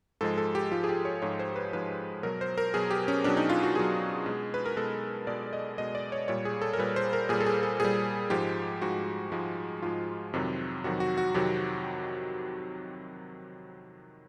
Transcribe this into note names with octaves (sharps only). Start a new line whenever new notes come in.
G#2 F3 G#3 A4
A4
G4
G#2 F3 G#3 F4
G#4
G4
C#5
G#2 F3 G#3 C#5
C5
B4
G#2 F3 G#3 B4
B2 F#3 A#4
C5
A#4
B2 F#3 G#4
G4
C#4
B2 F#3 D4
D#4
F4
F#4
B2 F#3 G#4
B2 G#3
B4
A#4
B2 G#3 A4
B2 G#3 D5
D#5
B2 G#3 D#5
D5
C#5
A#2 G3 C#5
G#4
A4
A#4
A#2 G3 B4
C5
A#4
A#2 G3 G#4
A4
G#4
A4
A#2 G3 G#4
G#2 F3 G#3 G4
G#2 F3 G#3 F#4
G#2 F3 G#3
G#2 F3 G#3 F4
F2 C3 D#3 F#3
F2 C3 D#3 F#3 F#4
F#4
F#4
F2 C3 D#3 F#3 G4